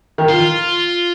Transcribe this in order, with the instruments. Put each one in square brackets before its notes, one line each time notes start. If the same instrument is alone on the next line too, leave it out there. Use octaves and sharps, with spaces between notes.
[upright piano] D#3
[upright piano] F3 [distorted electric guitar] F4